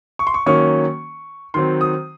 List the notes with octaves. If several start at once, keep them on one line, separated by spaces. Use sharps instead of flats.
C#6
C6
C#6
D#3 F#3 A#3 C#4 C#6
D#3 F#3 C4 C6
D#6